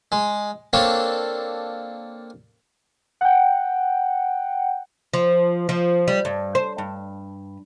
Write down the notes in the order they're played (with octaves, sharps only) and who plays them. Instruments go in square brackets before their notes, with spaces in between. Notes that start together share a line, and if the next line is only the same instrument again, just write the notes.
[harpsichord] G#3
A#3 C4 D4 A4 C#5
[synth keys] F#5 G5
[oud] F3
F3
G3
G2
C5
G2